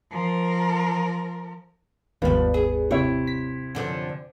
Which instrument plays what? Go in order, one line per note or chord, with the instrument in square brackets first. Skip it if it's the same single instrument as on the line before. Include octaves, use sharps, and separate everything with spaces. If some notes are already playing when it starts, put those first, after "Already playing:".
[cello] F3 A#4
[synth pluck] G1 D#2 G#2 [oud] F3 G3 [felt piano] B3
[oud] G#4
[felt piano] C3 E4 [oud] C#5
[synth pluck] B6
[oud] F#2 D3 F3